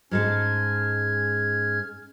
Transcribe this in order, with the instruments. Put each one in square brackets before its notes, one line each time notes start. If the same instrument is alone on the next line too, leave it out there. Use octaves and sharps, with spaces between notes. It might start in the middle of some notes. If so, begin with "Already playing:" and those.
[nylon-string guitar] G#2 G#3 A4 [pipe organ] C#4 F6 G#6